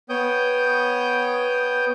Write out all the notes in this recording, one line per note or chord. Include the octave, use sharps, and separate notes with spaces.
B3 C#5 G5 D#6 G6